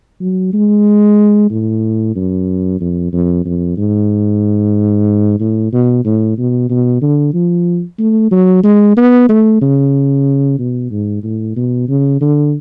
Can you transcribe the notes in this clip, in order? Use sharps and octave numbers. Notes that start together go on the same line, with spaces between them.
F#3
G#3
A2
F#2
F2
F2
F2
G#2
A2
B2
A2
B2
B2
D3
F3
A3
F#3
G#3
B3
A3
C#3
B2
G#2
A2
B2
C#3
D3